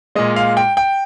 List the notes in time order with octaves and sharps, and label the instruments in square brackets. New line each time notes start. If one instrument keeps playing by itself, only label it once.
[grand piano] A#2 G#3 D#5
F5
G5
G5